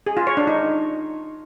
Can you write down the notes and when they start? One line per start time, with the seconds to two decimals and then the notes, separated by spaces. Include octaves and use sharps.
0.06 G#4
0.17 F4
0.27 C#5
0.37 D4
0.47 D#4